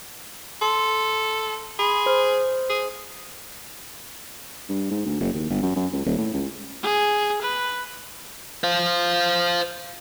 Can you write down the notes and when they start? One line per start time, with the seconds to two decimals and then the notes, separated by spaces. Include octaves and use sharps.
0.61 A4 C6
1.79 G#4 B5 C6
2.06 C5 F6
2.70 G#4
4.69 G2
4.91 G#2
5.05 D2
5.20 F#1
5.34 D#2
5.50 G1
5.63 F#2
5.76 F#2
5.93 C#2
6.06 D#1
6.18 A2
6.34 C#2
6.83 G#4
7.41 B4
8.64 C5 F5